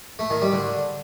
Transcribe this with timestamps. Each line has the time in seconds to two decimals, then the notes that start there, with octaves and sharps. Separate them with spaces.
0.19 A3
0.30 D#3
0.42 G3
0.53 D3